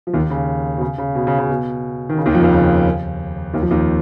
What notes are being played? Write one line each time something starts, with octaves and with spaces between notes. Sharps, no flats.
F3
D#2 D#3
C#3
B2
C#3
C#3
B2
C#3
C#3
B2
D#3
C#3
D#2 D#3
F2 F3
D#2 D#3
C#3
D#2 D#3
F2 F3
D#2 D#3